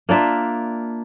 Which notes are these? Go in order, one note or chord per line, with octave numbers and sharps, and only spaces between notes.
A#3 D4 F4 E5